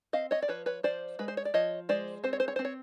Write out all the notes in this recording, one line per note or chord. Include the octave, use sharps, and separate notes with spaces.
C4 D#5 F5
C#5 D#5
D5
F3 B4 C#5
B4 C#5
F3 C5 D5
G#3 B4
C5
C#5
D5
F3 C#5 D#5
G#3 C5 D5
C4 C5
C#5
C5
C#5
C4 C5
C#5